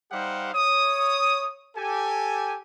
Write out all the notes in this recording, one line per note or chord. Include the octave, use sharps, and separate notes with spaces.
G3 D#4 G4 C5 F5 F#5
C#5 D#6
G4 A4 G#5